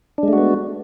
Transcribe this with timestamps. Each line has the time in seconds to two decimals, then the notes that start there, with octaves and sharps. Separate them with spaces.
0.18 D4
0.23 G#3
0.28 A3
0.33 F#4
0.38 B3